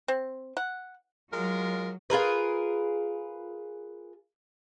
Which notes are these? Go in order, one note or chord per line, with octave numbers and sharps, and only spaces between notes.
C4
F#5
F#3 G#3 F4 A#4
F4 G#4 A#4 B4